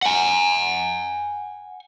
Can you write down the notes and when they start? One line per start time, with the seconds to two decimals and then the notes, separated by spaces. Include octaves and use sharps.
0.03 F#5 G#5